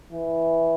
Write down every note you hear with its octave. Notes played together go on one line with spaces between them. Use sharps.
E3